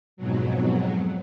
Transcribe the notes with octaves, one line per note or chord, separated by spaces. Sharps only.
F2 G#2 B2 F#3